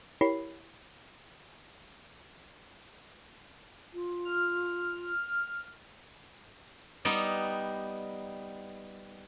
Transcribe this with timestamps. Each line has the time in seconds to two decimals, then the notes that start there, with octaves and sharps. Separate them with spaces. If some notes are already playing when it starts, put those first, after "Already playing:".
0.21 E4 G4 A#4 C#5 B5 C7
3.94 F4
4.25 F6
7.05 G3 B3 D#4